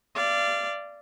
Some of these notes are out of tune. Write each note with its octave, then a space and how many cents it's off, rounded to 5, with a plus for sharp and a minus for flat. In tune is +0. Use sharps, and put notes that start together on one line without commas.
D5 +0 F5 -30